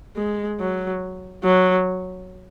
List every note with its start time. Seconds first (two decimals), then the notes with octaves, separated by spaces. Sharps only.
0.16 G#3
0.60 F#3
1.44 F#3